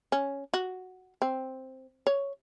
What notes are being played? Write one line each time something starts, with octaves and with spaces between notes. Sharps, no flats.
C#4
F#4
C4
C#5